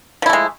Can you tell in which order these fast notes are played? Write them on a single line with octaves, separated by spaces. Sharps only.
F3 E4 A3 G#3